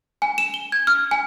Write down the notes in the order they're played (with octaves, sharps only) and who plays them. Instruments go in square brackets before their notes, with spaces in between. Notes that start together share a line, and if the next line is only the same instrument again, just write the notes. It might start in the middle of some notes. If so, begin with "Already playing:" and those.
[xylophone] G#5
E7
G7
G#6
F6
G#5